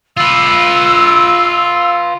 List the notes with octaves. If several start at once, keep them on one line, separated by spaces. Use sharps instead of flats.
F4 B4 E6